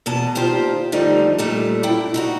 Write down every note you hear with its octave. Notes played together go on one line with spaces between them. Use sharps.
E2 B2 A5
A#2 D#3 F4 G4 C5
F2 D3 F3 G3 A3 D#4
D#2 A#2 G3 A3
F#2 D4 E4 G5
D#4 E4 F#4